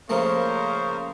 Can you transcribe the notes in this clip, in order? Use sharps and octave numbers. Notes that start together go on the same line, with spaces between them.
C#3 F3 A3 A#3 A#4 C5